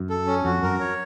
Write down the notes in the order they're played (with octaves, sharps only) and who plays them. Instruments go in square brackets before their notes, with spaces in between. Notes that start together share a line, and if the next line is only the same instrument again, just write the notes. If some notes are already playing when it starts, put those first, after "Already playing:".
Already playing: [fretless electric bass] F#2
[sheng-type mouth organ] A4
C#4
[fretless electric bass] F2 [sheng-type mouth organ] F#4
[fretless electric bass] F#2 [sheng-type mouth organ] A#4
[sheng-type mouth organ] C#5